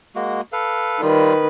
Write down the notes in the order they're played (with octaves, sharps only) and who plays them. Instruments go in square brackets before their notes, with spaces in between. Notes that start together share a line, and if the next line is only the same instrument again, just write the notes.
[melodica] G#3 A#3 F#4
A4 B4 F5
[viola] D#3 B4 [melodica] G3 F4